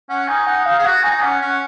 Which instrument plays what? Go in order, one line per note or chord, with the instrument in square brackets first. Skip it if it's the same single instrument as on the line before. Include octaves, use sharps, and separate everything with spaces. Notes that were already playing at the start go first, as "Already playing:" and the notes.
[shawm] C#4 [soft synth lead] F#5
[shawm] D#4 [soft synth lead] G#5
[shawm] D#4 [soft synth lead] F#5
[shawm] D#4 [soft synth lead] F5
[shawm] G#4
[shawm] F#4 [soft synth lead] F#5
[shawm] D#4 [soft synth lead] G#5
[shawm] C#4 [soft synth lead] F#5
[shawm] C#4 [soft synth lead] F#5